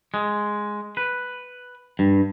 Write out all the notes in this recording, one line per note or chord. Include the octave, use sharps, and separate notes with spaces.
G#3
B4
G2